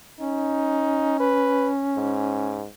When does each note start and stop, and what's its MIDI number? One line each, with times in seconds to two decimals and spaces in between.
0.20 2.62 61
0.20 1.16 63
1.20 1.69 71
1.97 2.67 44